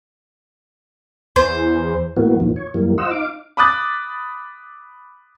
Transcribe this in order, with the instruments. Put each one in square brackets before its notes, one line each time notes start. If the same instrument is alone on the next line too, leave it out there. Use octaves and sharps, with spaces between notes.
[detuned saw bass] E2 [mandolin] C5
[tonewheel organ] A2 E3 A#3 B3 F#4
E2 A#2 D#3 F3
C#5
F#2 E3 G3 A#3
F4 C5 D#5 F#5 E6
D#4 F5 D6
[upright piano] B5 D6 D#6 F#6 A6